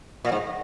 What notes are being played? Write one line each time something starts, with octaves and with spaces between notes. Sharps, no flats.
A#2
G#2